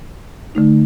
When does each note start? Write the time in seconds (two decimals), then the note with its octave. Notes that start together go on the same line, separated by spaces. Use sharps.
0.55 D3 A3 D#4